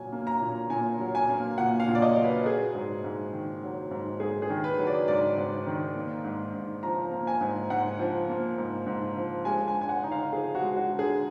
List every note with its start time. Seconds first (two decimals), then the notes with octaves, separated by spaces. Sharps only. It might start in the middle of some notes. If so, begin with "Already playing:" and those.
Already playing: A#2 F#3 G#5
0.12 A#3
0.27 A#5
0.41 A#2
0.70 A#2 G#5
1.00 F#3
1.15 G#5
1.29 A#3
1.58 A#2 F#5
1.80 F5
1.87 A#2
1.95 D5
2.02 D#5
2.17 F#3
2.24 B4
2.46 F#3 G#4
2.75 G#2
3.04 G#2
3.33 D#3
3.62 F#3
3.91 G#2
4.20 G#2 G#4
4.42 G#4
4.50 D#3
4.64 B4
4.79 F#3
4.87 D5
5.08 G#2 D5
5.37 G#2
5.66 D#3
5.96 A#3
6.24 G#2
6.54 G#2
6.83 F3 A#5
7.12 A#3
7.27 G#5
7.41 G#2
7.70 G#2 F#5
7.99 F3
8.29 A#3
8.58 G#2
8.87 G#2
9.16 F3
9.45 G#3 G#5
9.68 G#5
9.74 D3
9.81 G#5
9.89 F#5
10.03 D#4
10.12 F5
10.33 F3 G#4
10.55 F#4
10.61 G#3
10.77 F#4
10.92 D3
10.99 G#4